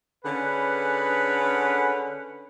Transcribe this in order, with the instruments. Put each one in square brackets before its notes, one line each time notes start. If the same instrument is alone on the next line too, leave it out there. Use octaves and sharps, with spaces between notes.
[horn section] D3 C#4 G#4 B4